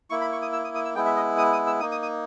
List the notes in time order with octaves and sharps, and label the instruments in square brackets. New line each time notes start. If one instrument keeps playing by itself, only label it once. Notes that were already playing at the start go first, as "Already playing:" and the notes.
[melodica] A#3 E4 C#6
B5
C#6
D#6
E6
D#6
D#6
E6
G#3 B3 E4 G5
E5
D#5
D#6
D#6
E6
A#3 D#4 D#6
D#6
D#6